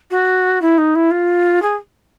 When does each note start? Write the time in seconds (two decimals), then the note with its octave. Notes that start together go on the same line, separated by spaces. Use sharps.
0.10 F#4
0.61 E4
0.78 D#4
0.95 E4
1.11 F4
1.62 G#4